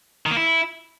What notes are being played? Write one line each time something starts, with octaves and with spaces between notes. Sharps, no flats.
D#3
A#3
E4